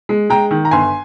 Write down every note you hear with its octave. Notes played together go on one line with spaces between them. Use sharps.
G#3
G#3 G5 A#5
D#3
A#5
G1 G#5 C6